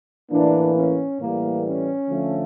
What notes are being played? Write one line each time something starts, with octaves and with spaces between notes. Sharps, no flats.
A2 E3 A#3 D4
C#4
A2 E3 G3 A#3
C#4
D3 F3 A3